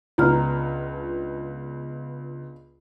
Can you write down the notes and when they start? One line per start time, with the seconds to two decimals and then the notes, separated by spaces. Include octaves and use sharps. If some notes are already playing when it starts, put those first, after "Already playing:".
0.18 C#2 B3 D4 F4 A#5 F6